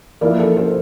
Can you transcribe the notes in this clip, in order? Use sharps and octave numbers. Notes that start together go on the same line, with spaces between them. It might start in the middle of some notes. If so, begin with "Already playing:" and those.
F3 A#3 E4 A#4 D5
A4
A4 C5